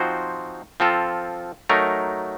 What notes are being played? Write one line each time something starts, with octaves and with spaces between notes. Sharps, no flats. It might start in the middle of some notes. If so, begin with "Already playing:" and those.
Already playing: F3 C4 D#4 F#4 C5
F3 C4 F4 A4
F#3 A3 D#4 A#4